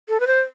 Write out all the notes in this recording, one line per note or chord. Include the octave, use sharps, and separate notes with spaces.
A4
B4
C5